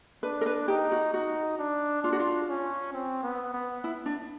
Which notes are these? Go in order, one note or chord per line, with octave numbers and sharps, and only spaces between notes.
D4 B4
A#4
B4
D#4 G4
F#4
D#4 F#4
D4
D4 F4
F#4
F4
C#4
C4
B3
B3
E4
D4